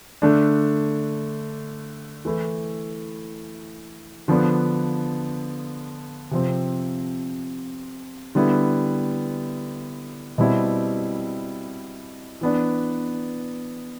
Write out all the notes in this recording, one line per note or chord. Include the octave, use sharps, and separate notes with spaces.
D3 A3 D4
E3 A3 E4
D3 F3 B3 D4
C3 F3 C4
D3 G3 B3 E4
B2 G3 C4 E4
E3 B3 D4